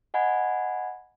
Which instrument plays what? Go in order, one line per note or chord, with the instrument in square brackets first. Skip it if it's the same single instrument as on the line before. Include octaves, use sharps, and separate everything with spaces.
[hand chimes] D#5 F#5 G#5 B5 G#6